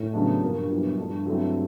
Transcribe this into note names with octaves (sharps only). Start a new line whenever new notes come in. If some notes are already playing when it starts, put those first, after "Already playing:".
Already playing: A2
C#3 F#3 B3 D4
G2 A#2 F3 A#3
A#2 F#3 B3 E4
G2 F3 A3 D4
F#3 A3 C4 E4